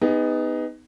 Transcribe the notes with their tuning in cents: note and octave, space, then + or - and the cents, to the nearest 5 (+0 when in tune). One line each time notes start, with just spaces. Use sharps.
B3 +20 D#4 +5 G#4 -30